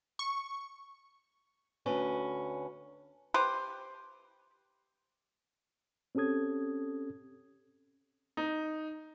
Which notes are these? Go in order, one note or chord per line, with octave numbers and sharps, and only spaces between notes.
C#6
D2 C#4 B4
G4 B4 C5
C4 C#4 G4 A4 D#6 G#6
D#4